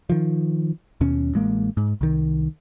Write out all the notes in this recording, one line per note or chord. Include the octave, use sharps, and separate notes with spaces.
D#3 F3
D#2 B2 C#4
A1 G#3 A#3
G#2
C2 D#3